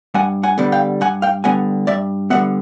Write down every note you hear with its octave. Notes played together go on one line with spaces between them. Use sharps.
G2 F#5 G#5
F#5 G#5
D3 G3 B3
F5 G5
G2 F#5 G#5
F5 G5
D3 G3 B3 F#5 G#5
G2 D5 E5
D3 G3 B3 E5 F#5